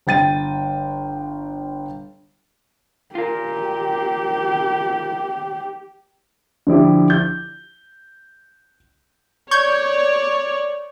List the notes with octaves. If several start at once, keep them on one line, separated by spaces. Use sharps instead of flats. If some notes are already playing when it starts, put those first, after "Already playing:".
G1 G5 A6 D#7
F4 G4 A#4
D3 F3 E4 G4
G6
C#5 D5 C#6 G6 G#6